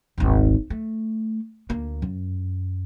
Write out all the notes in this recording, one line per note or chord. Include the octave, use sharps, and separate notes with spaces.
D#1 G#1
A3
D2 A#3
F#2